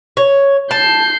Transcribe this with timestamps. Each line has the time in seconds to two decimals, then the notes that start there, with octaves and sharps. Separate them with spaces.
0.17 C#5
0.71 A5 G6 C7